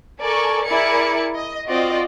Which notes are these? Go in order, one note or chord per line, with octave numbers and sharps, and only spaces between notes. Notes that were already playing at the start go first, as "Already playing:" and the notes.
A4 A#4 D5 G#5 C#6
E4 G#4 A#4 D5 G#5 C#7
D#5
C4 F4 F#4 D5 D#5